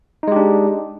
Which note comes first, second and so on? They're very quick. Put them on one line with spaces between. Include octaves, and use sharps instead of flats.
D#4 G#3 G4 D4